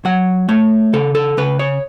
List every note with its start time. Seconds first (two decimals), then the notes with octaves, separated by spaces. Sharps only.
0.05 F#3 F#5
0.49 A3 C#5
0.93 C#3 A4
1.15 A4
1.37 C#3 B4
1.59 C#5